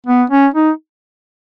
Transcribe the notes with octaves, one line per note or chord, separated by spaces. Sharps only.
B3
C#4
D#4